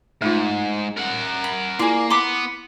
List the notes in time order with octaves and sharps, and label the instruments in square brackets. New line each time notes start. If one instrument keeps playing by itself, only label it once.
[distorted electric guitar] G#2 [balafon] A3 D#4 F4
[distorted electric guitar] A#4 F#5
[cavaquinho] B5
[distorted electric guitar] A#3 [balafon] E4 F4 [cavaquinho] G#4 D5
[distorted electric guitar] B3 [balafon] A#5 [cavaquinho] C6 D6